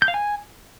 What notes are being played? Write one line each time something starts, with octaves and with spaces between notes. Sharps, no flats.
G6
F5
G#5